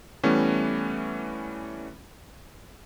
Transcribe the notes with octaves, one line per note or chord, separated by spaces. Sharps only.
E3 G3 A3 B3 C#4